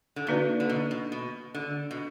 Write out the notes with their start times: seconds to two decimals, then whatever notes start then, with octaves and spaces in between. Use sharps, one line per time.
0.16 D3
0.27 B2 A#3 D#4 F#4 B4 D5
0.60 D3
0.70 B2
0.91 B2
1.12 B2
1.55 D3
1.91 B2